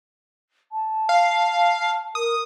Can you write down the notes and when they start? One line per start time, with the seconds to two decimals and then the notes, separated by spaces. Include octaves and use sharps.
0.72 A5
1.09 F5
2.15 A#4 D#6